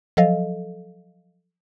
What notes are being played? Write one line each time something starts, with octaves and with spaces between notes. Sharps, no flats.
F3 F#3 A4 D#5 F5